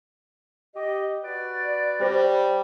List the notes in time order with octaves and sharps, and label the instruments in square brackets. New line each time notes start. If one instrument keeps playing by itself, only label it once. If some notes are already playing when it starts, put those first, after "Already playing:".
[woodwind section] G4 D#5
F#4 B4 D5
[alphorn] G3 [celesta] G4 C5 A#6